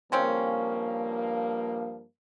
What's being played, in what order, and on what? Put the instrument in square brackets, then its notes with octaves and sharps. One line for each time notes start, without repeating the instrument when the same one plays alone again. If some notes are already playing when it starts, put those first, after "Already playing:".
[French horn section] G2 F3 A#3 [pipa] C#3 C4 C#4